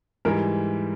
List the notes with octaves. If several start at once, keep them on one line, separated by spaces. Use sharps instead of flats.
G#2 E3 G3 A#4